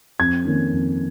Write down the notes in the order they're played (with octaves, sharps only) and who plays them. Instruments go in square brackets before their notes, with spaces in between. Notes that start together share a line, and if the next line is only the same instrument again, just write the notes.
[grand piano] F2 G#6
D#3 A#3 C#4
F2